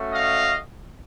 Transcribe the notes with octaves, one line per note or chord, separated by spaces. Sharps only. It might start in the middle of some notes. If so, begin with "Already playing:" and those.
Already playing: A3 C#4 F#4
D#5 F5